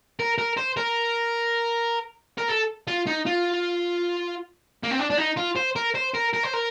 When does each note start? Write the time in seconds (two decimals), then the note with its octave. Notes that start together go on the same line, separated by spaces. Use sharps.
0.20 A#4
0.38 A#4
0.57 C5
0.77 A#4
2.38 A#4
2.49 A4
2.88 F4
3.07 D#4
3.26 F4
4.84 A#3
4.91 C4
4.99 D4
5.11 D4
5.18 D#4
5.37 F4
5.56 C5
5.76 A#4
5.95 C5
6.14 A#4
6.34 A#4
6.44 C5
6.54 A#4